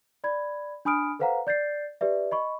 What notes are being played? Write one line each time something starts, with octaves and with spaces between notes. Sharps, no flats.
D5 B5 G#6
D4 G#5 B5 D#6 F6 D7
A4 B4 C5 F5 F#5 A#5
D5 G6 A6 C7
G4 B4 D5 E5
D#5 B5 C#6